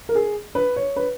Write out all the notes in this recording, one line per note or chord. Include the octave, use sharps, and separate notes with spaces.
A#4
G#4
B4
C#5
B4